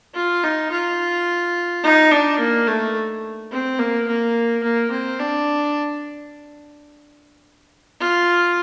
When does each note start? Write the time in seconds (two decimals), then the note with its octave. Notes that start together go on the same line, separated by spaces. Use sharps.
0.14 F4
0.44 D#4
0.72 F4
1.84 D#4
2.11 D4
2.39 A#3
2.67 A3
3.52 C4
3.79 A#3
4.08 A#3
4.63 A#3
4.91 C4
5.20 D4
8.00 F4